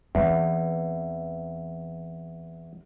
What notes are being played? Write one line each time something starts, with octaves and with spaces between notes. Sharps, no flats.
E2 C4